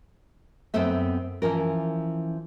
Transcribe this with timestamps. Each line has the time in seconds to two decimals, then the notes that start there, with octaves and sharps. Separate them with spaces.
0.74 F#2 B3 C4 A4 C5 E5
1.42 E3 F3 C#4 A#4